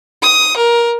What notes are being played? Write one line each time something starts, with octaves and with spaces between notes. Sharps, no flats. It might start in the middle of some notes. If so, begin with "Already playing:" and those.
D#6
A#4